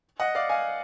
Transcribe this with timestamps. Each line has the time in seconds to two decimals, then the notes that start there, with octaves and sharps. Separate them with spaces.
0.20 D#5 F#5
0.35 D5 F5
0.49 F5 G#5